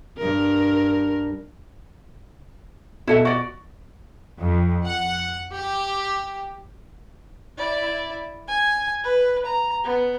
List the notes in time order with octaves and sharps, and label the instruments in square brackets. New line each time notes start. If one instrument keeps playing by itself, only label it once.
[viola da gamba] G2 A#4
[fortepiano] B2 [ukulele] E4 A4 E5
[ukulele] F#4 D5
[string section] F2
F#5
G4
[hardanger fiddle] E4 D5
G#5
B4
A#5
B3